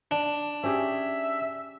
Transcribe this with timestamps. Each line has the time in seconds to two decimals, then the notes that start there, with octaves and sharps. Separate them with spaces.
0.11 D4
0.63 C#4 G4 G#4 E5